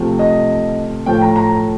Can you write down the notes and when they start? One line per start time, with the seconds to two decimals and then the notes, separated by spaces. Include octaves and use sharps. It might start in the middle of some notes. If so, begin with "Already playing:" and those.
Already playing: C3 F3 A3
0.19 D#5
1.06 A2 F3 A3 G5
1.21 A#5
1.36 A#5